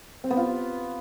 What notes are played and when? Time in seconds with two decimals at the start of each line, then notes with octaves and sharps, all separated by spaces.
0.24 C4
0.30 B3
0.37 F4